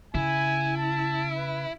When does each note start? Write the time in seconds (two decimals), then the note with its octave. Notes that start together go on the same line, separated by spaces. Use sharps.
0.15 C#3 E4 G#5
0.77 A5
1.37 B4